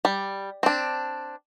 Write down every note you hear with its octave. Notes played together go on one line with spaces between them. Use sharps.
G3
C4 D4